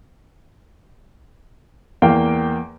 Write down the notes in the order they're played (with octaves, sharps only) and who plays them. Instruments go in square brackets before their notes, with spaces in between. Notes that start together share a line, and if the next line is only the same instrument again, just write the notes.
[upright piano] E2 A#3 F5 G5